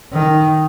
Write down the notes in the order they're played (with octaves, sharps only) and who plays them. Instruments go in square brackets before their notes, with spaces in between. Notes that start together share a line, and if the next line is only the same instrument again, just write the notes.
[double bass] D#3